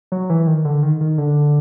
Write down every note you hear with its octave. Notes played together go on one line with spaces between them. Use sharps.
F#3
E3
D#3
D3
D#3
D#3
D3